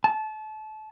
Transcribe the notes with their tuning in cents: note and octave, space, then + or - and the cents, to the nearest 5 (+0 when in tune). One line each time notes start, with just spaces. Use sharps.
A5 -25